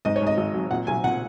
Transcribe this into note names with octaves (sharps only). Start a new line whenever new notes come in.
G#2 D#5
C#5
G#2 D#5
G#1
F#3
A#2 F#5
B1 G#5
A#2 F#5